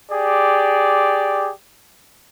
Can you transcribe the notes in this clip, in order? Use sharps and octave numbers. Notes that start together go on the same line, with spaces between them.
G4 G#4 D5